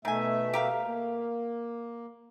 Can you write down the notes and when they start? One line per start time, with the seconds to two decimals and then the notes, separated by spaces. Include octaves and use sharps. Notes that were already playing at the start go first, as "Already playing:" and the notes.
0.05 B2 D#3 A3 E5 G#5
0.54 G4 A#4 F5
0.85 A#3